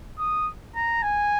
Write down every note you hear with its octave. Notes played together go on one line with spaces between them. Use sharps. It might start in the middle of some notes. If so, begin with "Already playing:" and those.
D#6
A#5
G#5